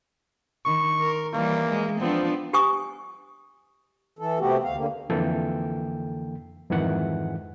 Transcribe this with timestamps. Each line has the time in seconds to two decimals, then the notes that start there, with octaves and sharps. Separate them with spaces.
0.66 D#3 C#6
1.00 A#4
1.33 E3 G3 A#3
1.70 G#3
2.01 F3 B3 C4 D4
2.53 G4 G#5 C#6 D#6
4.19 E3 A4
4.39 C3 A3 B3 F#4 G4
4.64 D2 F5
4.76 D3 A#3
5.10 F2 D3 E3 A#3 A4 G5
6.70 F2 G#2 D#3 E3 F#5